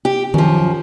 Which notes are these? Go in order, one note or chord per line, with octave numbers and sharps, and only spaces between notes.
G4
F#2 D#3 F3